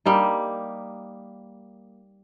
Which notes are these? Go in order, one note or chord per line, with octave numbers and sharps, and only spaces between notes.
G3 A#3 D#4